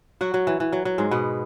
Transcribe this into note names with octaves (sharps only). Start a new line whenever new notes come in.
F#3 F#4
F#3
E3
E3
F#3
F#3
G#2 G#3
B2 B3